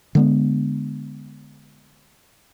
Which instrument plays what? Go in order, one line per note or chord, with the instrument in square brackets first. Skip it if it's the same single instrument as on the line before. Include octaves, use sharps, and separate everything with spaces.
[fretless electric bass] D3 G#3 B3